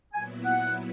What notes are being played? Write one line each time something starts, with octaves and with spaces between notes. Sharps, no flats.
A#2 F#3 B3 E4 G#5
F#5